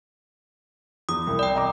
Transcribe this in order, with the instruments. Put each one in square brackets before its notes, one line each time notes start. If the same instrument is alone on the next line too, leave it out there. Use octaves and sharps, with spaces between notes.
[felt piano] E2 [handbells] D#6
[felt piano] C2
[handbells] D5 G5
[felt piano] D#5 A#5 D6